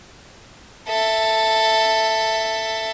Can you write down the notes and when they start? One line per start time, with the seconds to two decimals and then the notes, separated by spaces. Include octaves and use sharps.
0.89 A4 E5